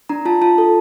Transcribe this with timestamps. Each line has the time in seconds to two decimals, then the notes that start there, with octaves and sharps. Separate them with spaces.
0.09 D4 A#5
0.25 F4 A5
0.42 F4 A5
0.58 A4